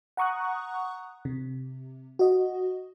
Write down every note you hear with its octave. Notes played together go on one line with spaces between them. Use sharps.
F#5 A#5 C#6 D#6 F#6
C3
F#4 D#5